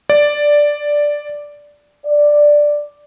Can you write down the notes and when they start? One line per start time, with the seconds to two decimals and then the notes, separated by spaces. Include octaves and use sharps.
0.10 D5
2.05 D5